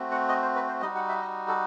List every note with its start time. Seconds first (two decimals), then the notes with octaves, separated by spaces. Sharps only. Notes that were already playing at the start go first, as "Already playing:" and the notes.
Already playing: A3 C4 F#4
0.11 F#5
0.29 D#5
0.43 C5
0.56 B4
0.68 C5
0.82 G3 D#5
0.84 D#4 F#4
0.95 F#5
1.09 E5
1.22 D#5
1.48 A4